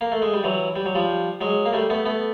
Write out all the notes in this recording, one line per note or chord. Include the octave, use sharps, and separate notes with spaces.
A#3
A3
G#3
G3
E3 F#3
G3
F#3
F3 G3
F#3 G#3
A#3
G3 A3
A3 B3
A3 B3